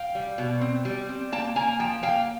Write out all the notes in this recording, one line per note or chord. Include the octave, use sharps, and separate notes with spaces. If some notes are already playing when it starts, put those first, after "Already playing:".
Already playing: F5 G5
G3
B2
C4
G3
C4
A#3 G5 A5
A#3 G#5 A#5
F3 G5 A5
A#3 F5 G5